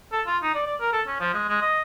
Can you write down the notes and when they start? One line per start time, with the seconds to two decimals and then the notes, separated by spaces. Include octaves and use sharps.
0.12 A4
0.27 F4
0.43 D#4
0.54 D5
0.66 D5
0.80 A#4
0.93 A4
1.07 C#4
1.20 F3
1.34 G#3
1.49 G#3
1.61 D#5